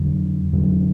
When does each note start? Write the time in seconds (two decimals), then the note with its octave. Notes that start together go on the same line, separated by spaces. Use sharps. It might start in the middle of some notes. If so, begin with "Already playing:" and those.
Already playing: F2 D3 F#3
0.52 F2 D3 F#3